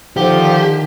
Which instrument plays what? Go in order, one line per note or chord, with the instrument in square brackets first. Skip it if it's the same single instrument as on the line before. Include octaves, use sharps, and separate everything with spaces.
[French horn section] D3 F3 [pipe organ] D#3 [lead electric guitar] G4